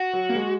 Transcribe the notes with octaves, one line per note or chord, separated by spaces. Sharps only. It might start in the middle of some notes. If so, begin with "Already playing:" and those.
Already playing: F#4
F#3
A#3
G#3